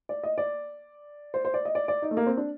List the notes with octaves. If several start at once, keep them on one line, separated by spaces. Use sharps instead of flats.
D5
D#5
D5
C5
C5
D5
D#5
D5
D5
D#4
A3
A#3
C4
D4